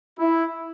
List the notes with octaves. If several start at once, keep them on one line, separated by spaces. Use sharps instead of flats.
E4